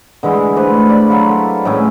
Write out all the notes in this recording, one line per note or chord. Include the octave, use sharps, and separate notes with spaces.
D3 E3 G#3 E4
A3 D4 B4 C5
D5 B5
F#3 E4 F4
A4
A2 G#3 C#4 E4